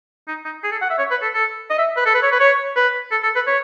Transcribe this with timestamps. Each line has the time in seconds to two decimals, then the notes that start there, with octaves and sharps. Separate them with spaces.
0.28 D#4
0.45 D#4
0.64 G#4
0.72 A4
0.82 F#5
0.90 E5
0.98 C#5
1.11 B4
1.22 A4
1.34 A4
1.70 D#5
1.78 E5
1.97 B4
2.06 A4
2.14 B4
2.22 C#5
2.32 B4
2.40 C#5
2.76 B4
3.11 A4
3.23 A4
3.36 B4
3.47 C#5